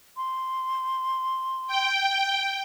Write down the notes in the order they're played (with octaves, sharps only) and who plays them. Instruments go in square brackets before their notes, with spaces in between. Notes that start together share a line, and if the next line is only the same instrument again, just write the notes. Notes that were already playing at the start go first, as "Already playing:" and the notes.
[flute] C6
[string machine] G5